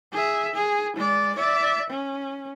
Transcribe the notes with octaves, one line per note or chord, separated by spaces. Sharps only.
G#4 E5
G#4
G#3 D5
D5 E5
C#4